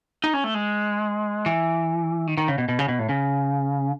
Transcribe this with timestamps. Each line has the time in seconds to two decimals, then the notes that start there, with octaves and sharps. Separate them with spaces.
0.24 D#4
0.34 C#4
0.44 A3
0.54 G#3
1.46 E3
2.27 D#3
2.38 D#3
2.48 C#3
2.58 B2
2.69 B2
2.79 C#3
2.88 B2
2.99 A2
3.09 C#3